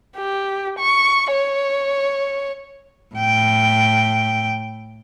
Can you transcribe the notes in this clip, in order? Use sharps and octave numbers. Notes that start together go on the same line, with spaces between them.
G4
C#6
C#5
A2 G5